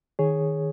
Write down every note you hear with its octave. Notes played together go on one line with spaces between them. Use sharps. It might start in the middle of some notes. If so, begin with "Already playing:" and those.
D#3 G#4 C#5